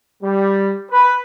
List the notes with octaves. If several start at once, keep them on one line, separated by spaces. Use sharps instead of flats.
G3
B4